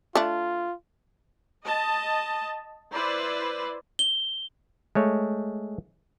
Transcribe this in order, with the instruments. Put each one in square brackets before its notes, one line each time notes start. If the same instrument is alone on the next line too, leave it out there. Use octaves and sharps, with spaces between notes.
[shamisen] A3 D4 [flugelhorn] F4
[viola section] D#5 A5
E4 B4 C5 D5
[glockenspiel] G7
[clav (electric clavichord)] G#3 A3 C#5